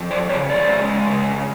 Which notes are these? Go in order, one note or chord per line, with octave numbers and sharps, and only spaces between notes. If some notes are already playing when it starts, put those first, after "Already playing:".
Already playing: F2
C5 D5
C#3 B4 C#5
C5 D5
G#3
C#3